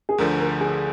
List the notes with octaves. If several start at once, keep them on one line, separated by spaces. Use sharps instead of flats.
G#4
D2 D3 F3 A#4
A#4
G#4